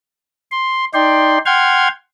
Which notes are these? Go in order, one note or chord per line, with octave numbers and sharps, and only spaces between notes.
C6
D#4 D5 G5 C6
F#5 G5 C6 F6 G#6